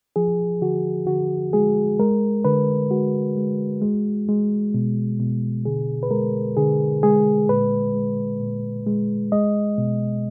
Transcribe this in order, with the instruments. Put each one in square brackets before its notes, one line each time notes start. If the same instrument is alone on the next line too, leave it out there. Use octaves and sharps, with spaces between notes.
[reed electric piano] F3 G#4
D3 F#4
D3 F#4
G#3 G#4
G#3 A#4
D3 B4
G#3 F#4
G#3
G#3
G#3
B2
B2
D3 G#4
B4
G#3 A#4
D3 G#4
G#3 G#4
A#2 B4
G#3
A#2
G#3
G#3 D#5
B2